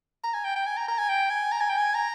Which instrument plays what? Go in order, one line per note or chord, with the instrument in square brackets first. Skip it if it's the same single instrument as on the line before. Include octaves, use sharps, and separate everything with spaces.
[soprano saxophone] A#5
G#5
G5
G5
G#5
A#5
A#5
G#5
G5
G#5
A#5
G#5
G5
G#5
A#5